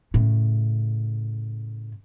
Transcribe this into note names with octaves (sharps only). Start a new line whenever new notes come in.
A2 C#3